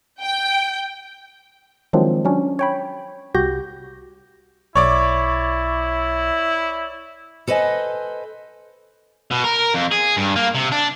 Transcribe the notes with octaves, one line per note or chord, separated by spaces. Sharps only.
G5
D#3 F3 F#3 G#3 C4 D4
F#3 C#4 D4
C#5 G5 B5
C2 F#4 G4 G6 A#6
B1 E4 C#5 D5 C#6 D6
A4 B4 C5 D#5 G#5
B2
A#4
F2
G#4
G2
A#3
C3
D4